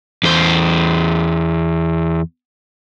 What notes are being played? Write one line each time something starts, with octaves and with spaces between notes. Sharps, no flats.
E2 C5